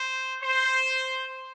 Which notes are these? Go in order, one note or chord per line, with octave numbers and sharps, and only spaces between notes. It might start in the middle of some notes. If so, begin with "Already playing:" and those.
Already playing: C5
C5